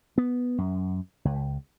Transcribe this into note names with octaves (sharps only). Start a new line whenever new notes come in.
B3
F#2
C#2